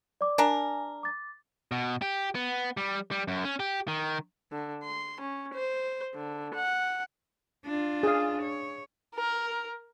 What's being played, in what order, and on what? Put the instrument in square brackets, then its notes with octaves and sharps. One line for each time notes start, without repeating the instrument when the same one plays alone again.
[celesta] D5 D6
[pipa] D4 A#4 [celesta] G#5
[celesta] D6 A6
[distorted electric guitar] B2
G4
B3
G3
G3
F#2
C#4
G4
D#3
[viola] D3
C6
C#4
C5
D3
F#5
[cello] D4 F4
[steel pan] G#4 F5
[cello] C#5
[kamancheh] A#4